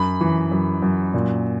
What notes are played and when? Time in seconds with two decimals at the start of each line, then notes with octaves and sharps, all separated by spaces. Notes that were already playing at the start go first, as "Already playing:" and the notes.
Already playing: F#2 B5
0.21 E3
0.51 F#2
0.82 F#2
1.14 A#2